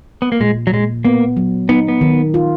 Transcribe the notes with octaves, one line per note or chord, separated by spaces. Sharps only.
B3
A#3
A#2 G#3
F#3
A#2 G#3
A#3 B3
F#3
B3 D#4
B3
D#3
F4